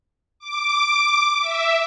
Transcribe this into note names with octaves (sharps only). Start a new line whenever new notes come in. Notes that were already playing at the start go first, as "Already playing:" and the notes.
D6
E5